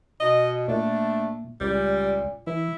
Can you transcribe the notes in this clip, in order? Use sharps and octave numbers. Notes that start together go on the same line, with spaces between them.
B2 D#5
A#2 A3 D4
C#2 A#2 G3
E3 E4